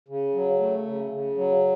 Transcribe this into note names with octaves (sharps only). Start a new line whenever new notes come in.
C#3
F#3
A3
C#3
C#3
F#3